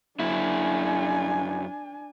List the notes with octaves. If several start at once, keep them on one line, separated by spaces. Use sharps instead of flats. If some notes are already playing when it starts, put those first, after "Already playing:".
F#2 D4 E4 G#5